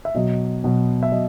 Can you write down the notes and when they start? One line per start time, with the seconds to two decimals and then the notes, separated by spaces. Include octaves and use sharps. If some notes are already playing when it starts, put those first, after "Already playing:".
0.05 E5
0.15 B2 F#3 D#5
0.64 B2 F#3
1.03 E5
1.12 F#3 D#5